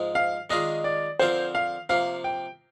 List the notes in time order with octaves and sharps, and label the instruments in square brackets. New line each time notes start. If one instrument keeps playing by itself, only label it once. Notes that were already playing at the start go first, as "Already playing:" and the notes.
Already playing: [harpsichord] G#2 F3 G#3
[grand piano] F5
[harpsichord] D#3 G#3 D4 F4 G#4 [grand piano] D#5
[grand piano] D5
[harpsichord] D3 F3 C4 F4 A#4 [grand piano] C5
[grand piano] F5
[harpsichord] C3 F3 A#3 [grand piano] F5
[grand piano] G5